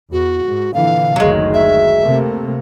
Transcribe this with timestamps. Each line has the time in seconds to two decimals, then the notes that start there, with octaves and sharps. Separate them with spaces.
0.12 E2 F#4
0.44 G#2
0.74 A#2 D3 E3 F5
1.16 F#1 D2 D#3 F#3 G#3
1.54 E5
2.02 C3 A3 A#3